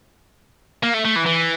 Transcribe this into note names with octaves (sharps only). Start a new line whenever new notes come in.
A#3
A3
A3
E3
E3